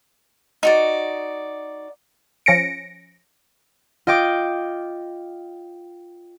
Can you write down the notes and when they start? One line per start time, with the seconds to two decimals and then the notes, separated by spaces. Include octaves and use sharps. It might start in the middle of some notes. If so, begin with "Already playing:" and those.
0.63 D#4 F#4 D5
2.46 F3 C#4 A#6 C#7 D7
4.07 F4 D#5 G5 D6